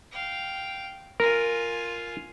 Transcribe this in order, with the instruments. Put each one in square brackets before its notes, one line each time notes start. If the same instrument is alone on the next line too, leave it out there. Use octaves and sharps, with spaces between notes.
[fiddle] F5 G5
[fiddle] F4 G#5 [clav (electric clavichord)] A#4